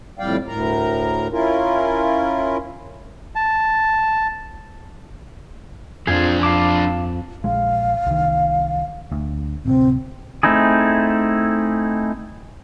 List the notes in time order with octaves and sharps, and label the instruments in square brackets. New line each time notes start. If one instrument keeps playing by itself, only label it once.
[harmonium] F2 A2 G3 D5 F5 G5
D2 A2 A#4 A#5
C#4 E4 F4 A#4
[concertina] A5
[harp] F2 [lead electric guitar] F3 D4 [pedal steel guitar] C4 F4 G#4
[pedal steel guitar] F5 A5 D6
[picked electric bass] A#1 G#3 [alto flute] F5
[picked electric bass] C2 D#3
D2
[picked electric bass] D1 C3 [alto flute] C4
[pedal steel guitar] A3 C4 D#4 E4 G#4